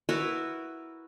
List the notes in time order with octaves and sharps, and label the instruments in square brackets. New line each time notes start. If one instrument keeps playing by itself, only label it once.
[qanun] E4 F#4 A#4 B4